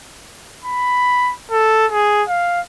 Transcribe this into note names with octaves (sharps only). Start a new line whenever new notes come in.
B5
A4
G#4
F5